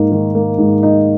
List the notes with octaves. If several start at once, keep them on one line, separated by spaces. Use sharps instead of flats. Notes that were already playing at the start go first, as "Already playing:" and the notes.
Already playing: G#2 A#3 D#4
D#3
A#3
G#2
D#4